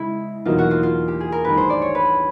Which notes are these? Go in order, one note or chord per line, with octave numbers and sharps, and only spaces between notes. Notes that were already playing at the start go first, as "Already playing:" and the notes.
Already playing: C#3 G#3 E4
E2 B2 F#3 A#3 D#4 F4
F#4
F4
F4
G4
G#4
A#4
A1 G2 D#3 B4
C5
D5
C#5
B4